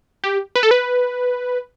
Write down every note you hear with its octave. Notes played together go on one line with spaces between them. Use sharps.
G4
B4
A4
B4